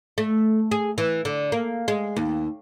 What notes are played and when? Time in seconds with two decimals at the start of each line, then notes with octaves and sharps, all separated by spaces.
0.18 A3
0.71 G#4
0.98 E3
1.25 D3
1.52 A#3
1.88 G#3
2.16 D#2